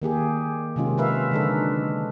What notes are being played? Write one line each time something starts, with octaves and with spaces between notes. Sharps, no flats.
D#3 A#3 G4 G#4
C3 D#3 G#3 C#4 F4
F4 A#4 B4 E5 F5
D3 F3 G#3 D4 D#4 A4